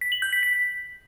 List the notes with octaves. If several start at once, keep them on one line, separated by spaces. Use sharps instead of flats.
B6
F#7
G6
B6
B6